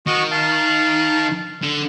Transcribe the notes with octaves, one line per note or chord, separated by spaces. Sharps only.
D#3 F#4 D#5 C#6
F5 A5
D3